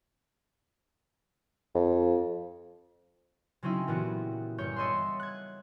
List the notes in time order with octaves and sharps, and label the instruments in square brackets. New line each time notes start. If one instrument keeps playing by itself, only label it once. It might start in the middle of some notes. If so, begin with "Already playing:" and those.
[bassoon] F2
[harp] C#3 F#3 C4 C#4 D#4 E4
A#2 E3 B3 F#4 G4
G1 C#5 G6 C#7
A4 C#5 D#5 E5 F#5 C6
F#6 G#6